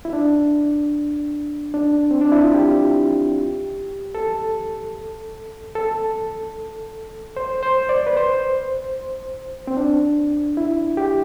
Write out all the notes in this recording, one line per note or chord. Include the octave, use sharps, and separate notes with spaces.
E4
D4
D4
C4
D4
E4
F4
G4
A4
A4
C5
C5
D5
B4
C5
C4
D4
E4
G4